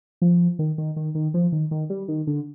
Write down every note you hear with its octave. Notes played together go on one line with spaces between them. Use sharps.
F3
D#3
D#3
D#3
D#3
F3
D#3
D#3
G3
D#3
D3